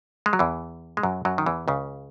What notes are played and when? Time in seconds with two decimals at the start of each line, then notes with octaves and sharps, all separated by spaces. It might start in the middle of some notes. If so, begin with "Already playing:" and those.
0.26 G#3
0.33 F#3
0.39 E2 E3
0.97 G#3
1.03 F#2 F#3
1.25 F#2 F#3
1.38 D#3
1.46 E2 E3
1.68 C#2 C#3